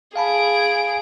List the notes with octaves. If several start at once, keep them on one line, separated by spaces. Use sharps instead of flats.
G#4 F5 A5 B5 D7